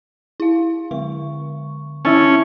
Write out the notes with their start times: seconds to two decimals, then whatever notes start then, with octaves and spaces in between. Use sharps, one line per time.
0.40 E4 F5
0.91 D3 G#3 C#6
2.05 C#4 E4 A5